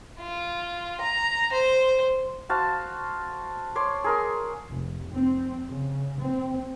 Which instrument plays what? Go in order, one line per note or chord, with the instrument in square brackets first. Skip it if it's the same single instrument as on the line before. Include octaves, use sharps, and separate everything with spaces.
[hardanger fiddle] F4
A#5
C5
[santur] F#4 C5 F5 A5
C#5 C6 D6
G#4 A#4 C6
[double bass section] F1
C4
C#3
C4